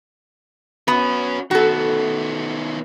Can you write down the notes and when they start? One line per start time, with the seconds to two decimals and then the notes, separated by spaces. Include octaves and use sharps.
0.88 B3 C#4 F#4
1.51 D#3 B3 F#4 A4